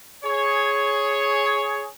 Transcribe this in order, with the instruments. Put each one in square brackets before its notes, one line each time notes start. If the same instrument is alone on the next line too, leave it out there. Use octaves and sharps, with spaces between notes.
[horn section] G#4 C#5